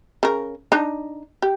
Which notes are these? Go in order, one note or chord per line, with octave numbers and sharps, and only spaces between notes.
C#3 A#4
D4 D#4
G4